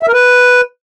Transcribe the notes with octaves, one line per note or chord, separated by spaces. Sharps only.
E5
A#4
B4